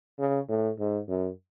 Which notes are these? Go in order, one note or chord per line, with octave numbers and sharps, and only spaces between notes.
C#3
A2
G#2
F#2